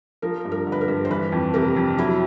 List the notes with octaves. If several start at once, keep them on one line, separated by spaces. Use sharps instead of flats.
F3 A#4
G2
A#4
D3
B4
A#4
G2
C5
E3 B4
F2
C3 A#4
F2
F#3 E4